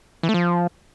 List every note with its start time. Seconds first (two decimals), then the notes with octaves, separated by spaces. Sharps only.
0.23 E3
0.29 A3
0.34 F3